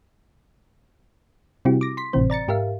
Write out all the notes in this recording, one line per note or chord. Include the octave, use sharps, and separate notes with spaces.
C3 G3 C4 E4 F#4 G4
D6 A#6
C6 B6
G#1 A2 C3 E3 C4 C5
D5 A#5 A6 C#7
G#2 G4 A#4 E5 F5